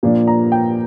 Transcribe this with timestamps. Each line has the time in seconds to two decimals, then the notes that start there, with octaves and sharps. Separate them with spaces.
0.03 A#2 F3 A#3 D4
0.27 A#5
0.52 G5